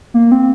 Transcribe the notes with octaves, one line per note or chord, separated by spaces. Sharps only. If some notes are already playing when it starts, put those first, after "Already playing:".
A#3
C4